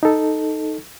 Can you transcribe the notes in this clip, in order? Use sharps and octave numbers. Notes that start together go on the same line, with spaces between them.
D#4 A4